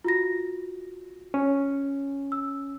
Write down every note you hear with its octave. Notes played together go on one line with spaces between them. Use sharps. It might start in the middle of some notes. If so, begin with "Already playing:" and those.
F4 F#4 A#6
C#4
E6